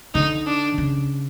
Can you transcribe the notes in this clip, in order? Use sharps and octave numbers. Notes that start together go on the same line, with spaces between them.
D3 D#4
D4
C#3